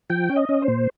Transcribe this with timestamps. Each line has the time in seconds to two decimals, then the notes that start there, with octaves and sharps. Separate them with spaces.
0.10 F3 G5
0.29 C#4
0.36 D#5
0.49 C#4
0.62 C5
0.68 A#2